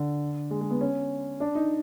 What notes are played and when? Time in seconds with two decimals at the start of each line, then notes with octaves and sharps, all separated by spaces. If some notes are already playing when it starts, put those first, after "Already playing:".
Already playing: D3
0.51 G#3
0.61 G#3
0.70 B3
0.81 C#4
1.40 D4
1.55 D#4